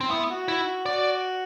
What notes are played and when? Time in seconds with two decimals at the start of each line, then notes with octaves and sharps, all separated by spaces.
0.01 C4
0.11 B3 E4
0.30 F#4
0.48 E4
0.86 F#4 D5